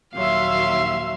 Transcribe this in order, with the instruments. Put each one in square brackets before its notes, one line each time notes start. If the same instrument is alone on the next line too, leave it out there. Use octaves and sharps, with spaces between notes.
[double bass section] A#1 D#2 [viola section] F#3 E5 [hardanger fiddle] F5 C6